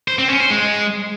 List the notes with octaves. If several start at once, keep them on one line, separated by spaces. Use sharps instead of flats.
C5
C4
C#4
C5
G#3